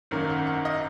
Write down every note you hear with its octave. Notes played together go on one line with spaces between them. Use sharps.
G#1 F#2 D#3 A#3
F#5
F#5
D#5